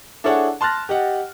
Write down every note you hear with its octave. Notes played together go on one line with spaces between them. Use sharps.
D4 E4 G#4 A4 C#5 F#5
A5 C6 F6 F#6 A6 A#6
G4 D#5 F#5